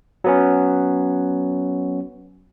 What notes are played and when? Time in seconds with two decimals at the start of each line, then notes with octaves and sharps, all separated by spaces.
0.24 F#3 B3 C#4